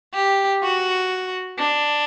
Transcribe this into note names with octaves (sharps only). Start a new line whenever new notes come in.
G4
F#4
D4